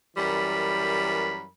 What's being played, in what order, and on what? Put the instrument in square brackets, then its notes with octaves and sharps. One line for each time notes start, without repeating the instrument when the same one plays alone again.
[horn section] F#2 E3 G3 A#4 B5